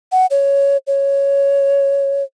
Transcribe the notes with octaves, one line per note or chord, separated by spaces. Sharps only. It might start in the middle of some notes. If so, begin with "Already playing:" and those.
F#5
C#5
C#5